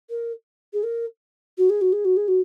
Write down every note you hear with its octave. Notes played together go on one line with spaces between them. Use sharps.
A#4
G#4
A#4
F#4
G#4
F#4
G#4
F#4
G#4
F#4